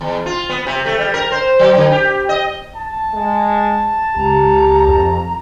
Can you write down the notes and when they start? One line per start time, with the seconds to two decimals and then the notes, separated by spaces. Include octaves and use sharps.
0.01 E2
0.26 F4
0.49 B3
0.66 C3
0.86 A3
0.98 G3
1.14 A#4
1.32 C5
1.59 F#3
1.77 D3
1.92 G4
2.29 D#5
2.76 A5
3.14 G#3
4.16 C#2 G4 A#5
4.87 F2